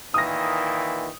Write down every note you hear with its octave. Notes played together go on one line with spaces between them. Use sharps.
A#2 D#3 E3 D#6 A#6